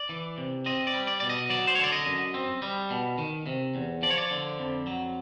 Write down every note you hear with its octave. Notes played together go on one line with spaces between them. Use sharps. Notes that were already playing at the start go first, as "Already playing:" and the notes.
Already playing: D5
E3
C3
C4 D#5
D5
G3
D5
B2 D5
D#5
F#3 D5
C5
C#5
D3
D5
D#5
F#2
C4
G3
B2
D#3
C3
E2
F3 D5
C#5
D5
D3
F2
F#3